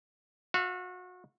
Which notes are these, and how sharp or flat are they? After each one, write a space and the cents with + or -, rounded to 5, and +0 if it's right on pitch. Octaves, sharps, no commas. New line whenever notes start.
F#4 -30 E5 +45